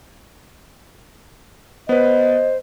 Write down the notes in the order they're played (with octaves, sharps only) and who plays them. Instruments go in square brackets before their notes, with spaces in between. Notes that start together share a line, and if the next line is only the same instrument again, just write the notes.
[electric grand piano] B3 B4 [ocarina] C5 [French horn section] D#5